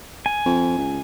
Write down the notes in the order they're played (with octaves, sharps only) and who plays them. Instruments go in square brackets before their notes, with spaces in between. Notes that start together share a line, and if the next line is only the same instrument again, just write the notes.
[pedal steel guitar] G#5
[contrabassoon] F2
C#2